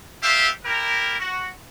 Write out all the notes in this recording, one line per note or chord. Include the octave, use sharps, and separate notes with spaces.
G4 A4 C5 E5 F5
E4 G4 A#4
F#4